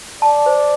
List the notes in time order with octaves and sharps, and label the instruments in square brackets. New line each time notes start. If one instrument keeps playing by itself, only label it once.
[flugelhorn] D5 [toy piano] A5
[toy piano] C5